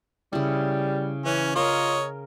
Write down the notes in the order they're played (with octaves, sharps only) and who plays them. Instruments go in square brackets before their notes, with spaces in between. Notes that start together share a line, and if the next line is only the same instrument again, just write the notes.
[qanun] C#3 E4 [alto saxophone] G3
[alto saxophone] E3 [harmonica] C#4
[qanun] C#4 A#4 [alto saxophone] F4 [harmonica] C#5 D#5